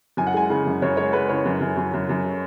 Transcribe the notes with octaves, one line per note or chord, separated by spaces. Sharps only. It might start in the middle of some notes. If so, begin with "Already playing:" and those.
F#2 G#5
F#5
G#3 G#5
C#3
F#2
F#2 C#5
G#3 C#5
G#3 B4
C#3 C#5
F#2
F#2
F#2
F#2
F#2